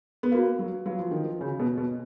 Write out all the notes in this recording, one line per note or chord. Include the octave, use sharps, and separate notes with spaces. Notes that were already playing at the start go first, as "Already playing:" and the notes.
B3
A#3 F#4 B4 F5
F#3
F#3 F#4 B4 F5
F3
D#3
F3
C#3 F#4 C#5 G#5
B2
B2